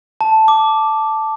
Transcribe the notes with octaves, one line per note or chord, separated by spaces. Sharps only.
A5
D6